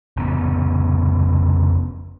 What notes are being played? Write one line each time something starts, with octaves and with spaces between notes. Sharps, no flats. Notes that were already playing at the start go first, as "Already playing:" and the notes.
F1 C#3 B3